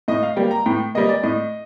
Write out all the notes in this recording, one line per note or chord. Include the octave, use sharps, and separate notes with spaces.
A2 D#5
F5
G3 A#3 G5
A#5
A2 G5
G3 A#3 D#5
D5
A2 D#5